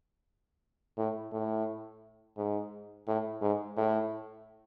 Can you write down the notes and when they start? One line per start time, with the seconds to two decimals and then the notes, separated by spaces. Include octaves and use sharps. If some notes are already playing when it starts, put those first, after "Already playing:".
0.97 A2
1.32 A2
2.37 G#2
3.07 A2
3.42 G#2
3.77 A2